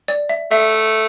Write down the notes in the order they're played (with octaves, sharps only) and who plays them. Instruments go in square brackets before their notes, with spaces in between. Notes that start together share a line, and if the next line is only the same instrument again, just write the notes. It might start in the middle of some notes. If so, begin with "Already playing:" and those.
[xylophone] D5
E5
[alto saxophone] A3 [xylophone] E5